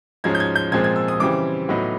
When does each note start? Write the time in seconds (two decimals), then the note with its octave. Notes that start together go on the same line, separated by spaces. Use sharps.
0.24 G#2 F3 G#3 C#4 G#6
0.35 G6
0.40 G#6
0.56 G6
0.72 A#2 F3 G#3 C4 G#6
0.84 G#6
0.96 E6
1.08 D#6
1.20 C#3 E3 G3 C4 D6
1.69 A2 F#3 B3 D#4